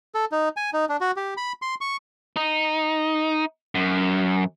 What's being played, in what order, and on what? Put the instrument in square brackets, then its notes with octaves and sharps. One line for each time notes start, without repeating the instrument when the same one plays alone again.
[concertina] A4
D#4
G#5
D#4
D4
F#4
G4
B5
C6
C#6
[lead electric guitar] D#4
F#2